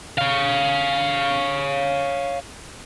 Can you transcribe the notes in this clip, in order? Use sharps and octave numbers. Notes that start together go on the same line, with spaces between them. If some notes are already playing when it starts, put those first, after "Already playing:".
C#5 F5